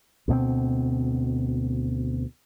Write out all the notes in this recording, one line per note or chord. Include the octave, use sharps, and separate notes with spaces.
D2 B2 B3 C4